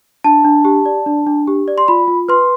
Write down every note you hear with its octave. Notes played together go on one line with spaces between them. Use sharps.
D4 A5
D4
G4
D5
D4
D4
G4
D5
C6
F4 B5
F4
B4 C6